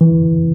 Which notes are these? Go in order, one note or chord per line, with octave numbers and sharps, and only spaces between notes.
E3